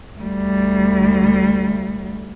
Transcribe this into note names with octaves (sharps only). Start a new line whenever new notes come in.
D2 G3